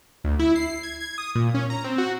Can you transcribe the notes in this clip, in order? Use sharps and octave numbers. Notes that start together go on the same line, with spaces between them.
D2
E4
C7
G#6
G#6
D#6
A#2
C#4
A#5
C4
F#4